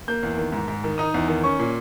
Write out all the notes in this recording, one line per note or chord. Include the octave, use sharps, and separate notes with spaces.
A#3 G6
E2
D#3
G#2
G#2
D#3
D#4 D#6
E2
D#3
C#4 C#6
A#2